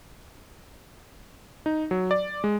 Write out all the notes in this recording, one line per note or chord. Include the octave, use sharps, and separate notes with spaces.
D#4
F#3
D5
G#3